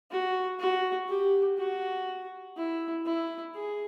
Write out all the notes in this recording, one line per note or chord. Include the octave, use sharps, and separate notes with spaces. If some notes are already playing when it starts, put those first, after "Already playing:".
F#4
F#4
G4
F#4
E4
E4
G#4